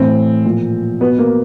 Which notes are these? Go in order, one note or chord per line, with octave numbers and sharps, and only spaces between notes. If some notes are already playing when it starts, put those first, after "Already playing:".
Already playing: A2 E3 C4
A#2 F3
B2 B3
A#3